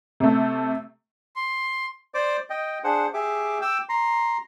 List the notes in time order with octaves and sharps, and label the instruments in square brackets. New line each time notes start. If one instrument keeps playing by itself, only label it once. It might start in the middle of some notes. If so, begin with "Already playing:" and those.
[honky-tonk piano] C3 A3
[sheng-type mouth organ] C6
[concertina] C5 D5 D6
D#5 G5
D4 G#4 C5 F#5
G4 G#4 E5 D6
G5 D6 E6
A#5 C6